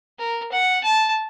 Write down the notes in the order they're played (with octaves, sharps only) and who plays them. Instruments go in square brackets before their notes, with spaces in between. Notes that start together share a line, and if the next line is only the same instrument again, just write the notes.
[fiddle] A#4
F#5
A5